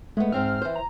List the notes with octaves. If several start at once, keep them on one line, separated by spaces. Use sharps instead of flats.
G#3 A3 B3
G#2 C4 E5 F6
E3 C5
A#5